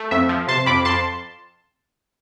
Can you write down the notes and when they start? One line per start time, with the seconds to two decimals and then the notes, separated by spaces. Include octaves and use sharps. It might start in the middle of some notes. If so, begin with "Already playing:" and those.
Already playing: A3
0.11 F2 E5
0.29 F3
0.48 C3 A5 C6
0.66 F2 B5 D6
0.85 F2 A5 C6